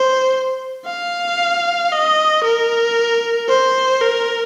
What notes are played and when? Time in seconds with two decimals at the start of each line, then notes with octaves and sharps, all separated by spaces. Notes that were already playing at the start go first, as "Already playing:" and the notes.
Already playing: C5
0.86 F5
1.92 D#5
2.44 A#4
3.49 C5
4.01 A#4